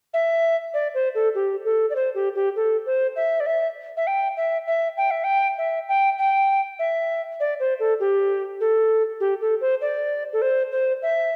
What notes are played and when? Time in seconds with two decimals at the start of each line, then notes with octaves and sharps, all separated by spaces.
0.14 E5
0.74 D5
0.94 C5
1.15 A4
1.35 G4
1.65 A4
1.90 D5
1.95 C5
2.15 G4
2.35 G4
2.56 A4
2.86 C5
3.16 E5
3.40 D5
3.46 E5
3.97 E5
4.07 G5
4.37 E5
4.67 E5
4.97 G5
5.11 E5
5.24 G5
5.58 E5
5.89 G5
6.18 G5
6.79 E5
7.40 D5
7.60 C5
7.80 A4
8.00 G4
8.60 A4
9.20 G4
9.41 A4
9.61 C5
9.81 D5
10.33 A4
10.42 C5
10.72 C5
11.02 E5